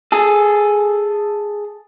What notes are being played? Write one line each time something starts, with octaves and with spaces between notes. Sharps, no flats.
G#4 A4